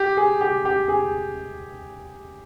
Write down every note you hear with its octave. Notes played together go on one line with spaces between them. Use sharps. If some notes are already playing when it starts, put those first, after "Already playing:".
Already playing: G4
G#4
G4
G4
G#4